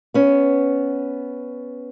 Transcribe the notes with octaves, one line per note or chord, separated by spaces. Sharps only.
B3 C#4